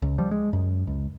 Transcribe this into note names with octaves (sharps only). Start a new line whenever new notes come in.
C#2
F3 G3
G#3
F#2
C#2